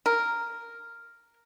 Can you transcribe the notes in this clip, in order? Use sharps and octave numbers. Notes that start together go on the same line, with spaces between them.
A#4